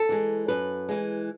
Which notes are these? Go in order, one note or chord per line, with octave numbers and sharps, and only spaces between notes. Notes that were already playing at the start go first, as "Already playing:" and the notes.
Already playing: A4
E3 G#3
F#2 B4
E3 G#3